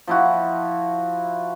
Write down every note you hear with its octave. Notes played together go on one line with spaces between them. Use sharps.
F3 E4 F#4